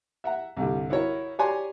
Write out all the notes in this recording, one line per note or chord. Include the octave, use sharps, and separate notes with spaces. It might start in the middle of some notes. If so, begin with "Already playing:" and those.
E5 F#5 A#5
C2 G2 D3
D#4 E4 F#4 A#4 C#5
G4 C#5 D5 G#5 A#5 C6